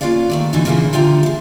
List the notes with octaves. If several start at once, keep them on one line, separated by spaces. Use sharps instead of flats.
A#3 C#4 F4 B4 D5 F5
D#3 A3 D5
B2 D3 E3 A3 D#4 F#4
A#2 C#3 E3 A#3 D#4 E4
D3 F4 G4 E5 G5 A#5
E4 G#4